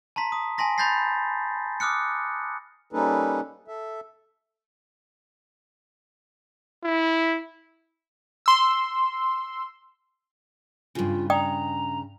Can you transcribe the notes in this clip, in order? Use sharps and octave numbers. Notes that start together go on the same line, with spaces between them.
A5 A#5 C6 B6
D#6
G#5 A5 C6 A#6 B6
B5 C6 G6 A6 A#6 C7
D6 D#6 F6 F#6 C#7
G3 A#3 C#4 D#4 A4 B4
A4 E5
E4
C6 E6
G2 C#3 F4
D5 G5 A#5 D#6